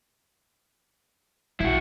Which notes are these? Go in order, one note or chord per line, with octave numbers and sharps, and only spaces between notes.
B1 E4 F#4